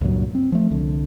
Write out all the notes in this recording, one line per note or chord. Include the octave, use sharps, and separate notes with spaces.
C#2 G2 A#2 F#3
C4
F3 A3
C2 D3